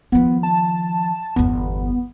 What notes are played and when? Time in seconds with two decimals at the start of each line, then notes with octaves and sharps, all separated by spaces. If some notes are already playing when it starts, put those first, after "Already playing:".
0.12 D#3 F3 B3
0.43 A5
1.36 G1 E2 B3